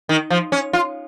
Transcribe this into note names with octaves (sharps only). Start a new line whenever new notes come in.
D#3
F3
C#4
F4